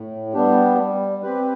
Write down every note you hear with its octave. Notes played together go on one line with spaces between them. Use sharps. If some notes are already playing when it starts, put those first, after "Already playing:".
Already playing: A2
G3 B3 D4 G4
G3
C4 G4 B4